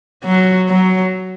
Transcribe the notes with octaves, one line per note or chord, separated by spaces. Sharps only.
F#3
F#3